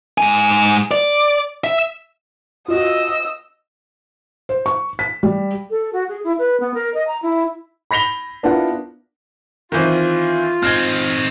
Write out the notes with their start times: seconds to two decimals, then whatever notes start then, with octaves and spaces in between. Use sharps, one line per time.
0.18 G#2 G#5
0.91 D5
1.64 E5
2.68 F4 F#4 D#5 E6
4.49 C5
4.66 C#6
4.99 B6
5.23 G3
5.70 A4
5.93 F#4
6.09 G#4
6.24 E4
6.39 B4
6.60 B3
6.74 A#4
6.94 D#5
7.07 A#5
7.23 E4
7.91 B5 A#6 B6 F7 G7
8.43 B3 D4 E4 F4 A#4 F#5
9.72 D#3 E3 C4 F4
10.63 C4 D#4 F6 G#6